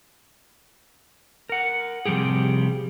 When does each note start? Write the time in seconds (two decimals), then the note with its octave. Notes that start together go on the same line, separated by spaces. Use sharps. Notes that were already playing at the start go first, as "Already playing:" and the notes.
1.49 A#4 F#5
2.05 C3 F3 G3 G4 G#4